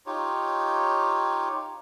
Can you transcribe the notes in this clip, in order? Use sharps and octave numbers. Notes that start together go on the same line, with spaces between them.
D#4 F4 G4 C#5